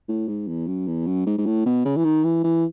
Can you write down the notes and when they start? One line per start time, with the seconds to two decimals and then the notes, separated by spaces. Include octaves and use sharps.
0.08 A2
0.28 G#2
0.48 E2
0.67 F#2
0.87 E2
1.07 F#2
1.26 G#2
1.38 G#2
1.46 A2
1.66 B2
1.85 C#3
1.97 E3
2.05 D#3
2.24 E3
2.44 E3